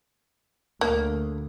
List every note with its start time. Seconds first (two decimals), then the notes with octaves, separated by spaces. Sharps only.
0.81 D2 A#3